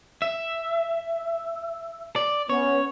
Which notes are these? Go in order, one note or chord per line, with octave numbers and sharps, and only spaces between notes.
E5
D5
B3 C#4 C#5